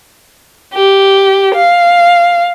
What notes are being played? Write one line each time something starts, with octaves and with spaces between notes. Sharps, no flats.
G4
F5